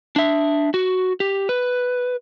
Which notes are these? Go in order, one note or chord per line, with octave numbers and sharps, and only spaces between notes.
D4 E5
F#4
G4
B4